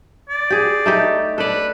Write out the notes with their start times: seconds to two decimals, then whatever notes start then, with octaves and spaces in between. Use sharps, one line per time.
0.30 D5
0.50 G4 G#4
0.86 A3 D#4 G4
1.38 A4 B4 D5